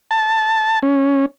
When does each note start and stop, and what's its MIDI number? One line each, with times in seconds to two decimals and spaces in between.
0.11 0.79 81
0.83 1.26 61